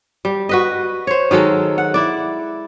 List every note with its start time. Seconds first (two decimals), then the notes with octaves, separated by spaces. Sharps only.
0.25 G3
0.49 F#4 B4 D#5
1.07 C5 C#5
1.31 D#3 F#3 G#3 A4
1.78 F#5
1.94 E4 D5